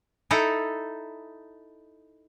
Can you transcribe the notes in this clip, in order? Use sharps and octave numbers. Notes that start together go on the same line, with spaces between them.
D#4 E4 A4 A#5